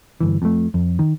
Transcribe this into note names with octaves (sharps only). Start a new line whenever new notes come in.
G1 E3
F2 A3
F2
D#3